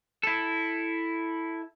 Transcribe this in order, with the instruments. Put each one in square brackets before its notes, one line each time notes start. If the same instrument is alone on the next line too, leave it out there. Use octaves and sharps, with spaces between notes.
[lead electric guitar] E4 A4